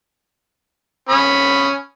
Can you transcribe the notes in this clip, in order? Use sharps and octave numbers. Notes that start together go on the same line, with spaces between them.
C#4 B5 D#6